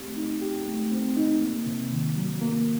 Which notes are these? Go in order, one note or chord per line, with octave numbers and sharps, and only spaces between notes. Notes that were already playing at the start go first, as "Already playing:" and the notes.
Already playing: A3 C4 G4
D#4
G4
A3
C4
D#4
A#3
C3
D#3
F#3
A#3